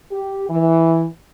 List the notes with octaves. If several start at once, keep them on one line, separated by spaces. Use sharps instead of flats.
G4
E3